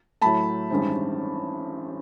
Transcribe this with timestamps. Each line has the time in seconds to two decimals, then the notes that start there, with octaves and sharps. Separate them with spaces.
0.22 A2 F#3 A3 A5 B5
0.70 A1 G2 D#3 G#3 C4